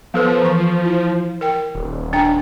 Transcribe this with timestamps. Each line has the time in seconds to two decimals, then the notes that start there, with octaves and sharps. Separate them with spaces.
0.14 F3 B3 A4 B4
0.41 E3 C#6
0.85 E4
1.41 A#4 G5
1.75 D#1
2.13 D4 G5 A#5